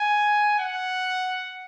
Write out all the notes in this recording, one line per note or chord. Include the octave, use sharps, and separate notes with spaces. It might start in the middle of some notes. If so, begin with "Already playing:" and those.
Already playing: G#5
F#5